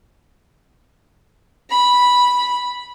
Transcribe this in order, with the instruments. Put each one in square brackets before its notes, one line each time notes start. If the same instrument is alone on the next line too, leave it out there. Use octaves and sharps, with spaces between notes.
[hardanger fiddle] B5